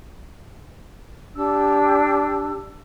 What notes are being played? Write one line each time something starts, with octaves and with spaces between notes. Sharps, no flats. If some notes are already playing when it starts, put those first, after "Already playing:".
D4 G4 E6